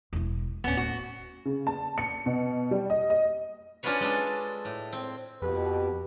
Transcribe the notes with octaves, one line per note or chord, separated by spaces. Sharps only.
E1 E4
D1 B3 C#4
F#4
C#3
A5
C#7
B2
G3
D#5
D#5
C#4 D4 F4 F#4 B4 C#5
G#3 D4 A4
A2
C4
F2 B2 G4 B4